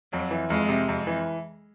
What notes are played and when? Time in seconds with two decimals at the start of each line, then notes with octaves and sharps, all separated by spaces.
0.12 F2 F#3
0.31 E3
0.50 F2 G#3
0.69 C3
0.89 F2
1.07 E3